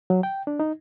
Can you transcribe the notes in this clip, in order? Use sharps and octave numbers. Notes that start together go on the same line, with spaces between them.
F#3
G5
D4
D#4